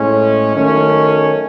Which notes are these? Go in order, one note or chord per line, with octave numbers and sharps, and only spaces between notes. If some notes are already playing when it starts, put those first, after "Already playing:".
Already playing: A2 G#3 C#4
D#3 F#3 A3 C#4